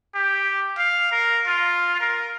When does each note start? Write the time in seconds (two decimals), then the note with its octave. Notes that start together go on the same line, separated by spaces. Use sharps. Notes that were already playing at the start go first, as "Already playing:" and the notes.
0.15 G4
0.78 F5
1.12 A#4
1.47 F4
2.00 A#4